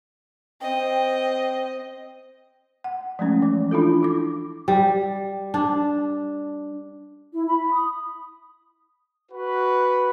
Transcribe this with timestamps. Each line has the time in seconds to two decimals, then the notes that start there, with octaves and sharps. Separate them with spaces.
0.61 C4 D#5 G5
2.84 F#5
3.19 F3 G#3 A3 C#4
3.42 E3
3.71 D4 E4 F4 A4
4.03 E4 D6
4.68 G3
5.54 D4
7.33 E4
7.47 B5
7.73 D#6
9.32 F#4 B4